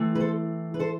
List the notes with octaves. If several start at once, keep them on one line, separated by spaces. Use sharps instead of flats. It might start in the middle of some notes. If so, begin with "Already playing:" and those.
Already playing: E3 A3 C4
B4
A4 C5
B4
A4 C5